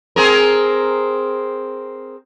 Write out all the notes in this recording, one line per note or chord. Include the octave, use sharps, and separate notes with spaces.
C4 G#4 A#4